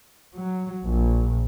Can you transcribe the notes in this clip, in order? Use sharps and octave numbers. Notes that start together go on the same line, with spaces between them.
F#3
A#1